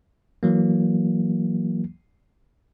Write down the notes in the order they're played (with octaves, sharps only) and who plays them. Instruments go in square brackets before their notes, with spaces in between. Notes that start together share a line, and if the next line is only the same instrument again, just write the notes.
[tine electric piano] E3 F#3 A#3